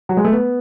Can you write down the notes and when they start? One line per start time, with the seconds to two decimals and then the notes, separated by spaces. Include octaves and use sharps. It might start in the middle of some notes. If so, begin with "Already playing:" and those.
0.09 F#3
0.17 G#3
0.25 A3
0.32 B3